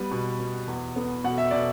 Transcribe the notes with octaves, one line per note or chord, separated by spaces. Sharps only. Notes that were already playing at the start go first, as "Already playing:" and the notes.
Already playing: G3 B3 B4
B2
B2
E2
B3
B2 F#5
E5
B2 D5